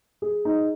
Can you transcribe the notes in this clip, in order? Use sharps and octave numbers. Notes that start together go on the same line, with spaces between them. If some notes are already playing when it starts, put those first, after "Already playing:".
G#4
D#4